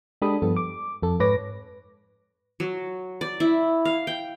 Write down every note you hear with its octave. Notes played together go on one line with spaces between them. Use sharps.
G#3 D4 G4 A4 B5 D#6
G2 F3 B3 A4
D6
F2 A4
G#2 B4 C#5 D6 A#6
F#3
D5
E4
F5
G5